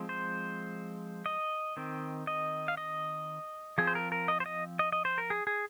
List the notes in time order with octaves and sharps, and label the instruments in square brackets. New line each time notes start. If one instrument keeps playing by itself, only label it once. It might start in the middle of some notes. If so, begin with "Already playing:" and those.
Already playing: [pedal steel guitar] F3 G#3 C4
C5
D#5
D#3 C4
D#5
F5
D#5
F3 C4 G#4
C5
A#4
A#4
D#5
C5
D#5
D#5
D#5
C5
A#4
G#4
G#4